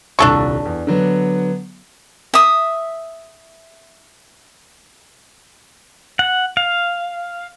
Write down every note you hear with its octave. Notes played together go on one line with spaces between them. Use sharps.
D#1 C2 D4 A4 C#6
E2
D3 F#3 B3
E5 D#6
F#5
F5